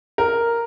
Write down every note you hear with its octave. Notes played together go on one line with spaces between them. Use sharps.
A#4